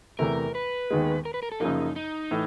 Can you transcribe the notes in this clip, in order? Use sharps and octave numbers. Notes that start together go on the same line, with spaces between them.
E2 C3 E3 A3 A#4
B4
D#2 D#3 G#3 B3
A#4
B4
A#4
A4
F#2 C#3 F3 A#3 D#4
D#4
A2 E3